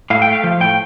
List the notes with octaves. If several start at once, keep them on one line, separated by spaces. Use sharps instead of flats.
A2 F5
G5
A3
F5
F3
A2 G5